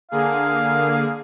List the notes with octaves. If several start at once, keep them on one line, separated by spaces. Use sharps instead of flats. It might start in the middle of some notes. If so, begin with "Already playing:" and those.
D3 A#3 G#4 F5